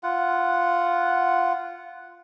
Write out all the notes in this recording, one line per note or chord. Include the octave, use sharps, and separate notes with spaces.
F4 F#5